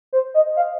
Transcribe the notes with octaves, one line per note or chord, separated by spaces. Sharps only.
C5
D#5
F5